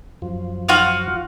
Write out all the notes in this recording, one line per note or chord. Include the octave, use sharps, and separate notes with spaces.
F#2 F3
F4 F#4 F5